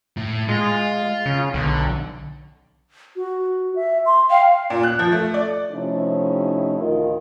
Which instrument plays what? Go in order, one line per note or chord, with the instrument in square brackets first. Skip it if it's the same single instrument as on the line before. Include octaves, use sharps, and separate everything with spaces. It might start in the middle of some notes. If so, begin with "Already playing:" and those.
[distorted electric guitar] A2
[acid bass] G#3 [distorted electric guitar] F4
[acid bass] C#3
[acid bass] B1 [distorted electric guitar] D3
[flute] F#4
E5
C6
[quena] F5 [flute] G5
[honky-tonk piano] A#2
F#6
F3
A3
D5
[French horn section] C3 F3 A3 C#4 D#4 E4
D2 A2 D#3 F4 A#4 D#5